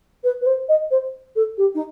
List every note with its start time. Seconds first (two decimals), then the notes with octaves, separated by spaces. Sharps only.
0.24 B4
0.41 B4
0.46 C5
0.68 D#5
0.91 C5
1.36 A4
1.58 G4
1.75 D#4